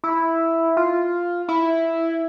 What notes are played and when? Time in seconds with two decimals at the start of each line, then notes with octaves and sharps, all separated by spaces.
0.04 E4
0.77 F4
1.48 E4